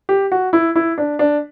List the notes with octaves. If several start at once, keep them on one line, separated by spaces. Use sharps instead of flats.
G4
F#4
E4
E4
D4
D4